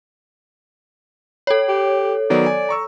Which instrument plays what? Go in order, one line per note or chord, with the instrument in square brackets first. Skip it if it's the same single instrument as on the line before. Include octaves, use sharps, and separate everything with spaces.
[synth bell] A4 C#5
[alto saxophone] G4
[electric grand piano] D#3 F#3 B3 [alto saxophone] D5
[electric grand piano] G#5
A#5 C#6 E6